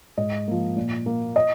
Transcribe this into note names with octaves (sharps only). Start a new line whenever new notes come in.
G#2 D#5
F3 A#3
A#2
A#3
D#5